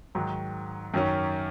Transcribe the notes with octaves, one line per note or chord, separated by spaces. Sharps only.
G#2 D#3 F#3
F#2 D#3 F#3 C#4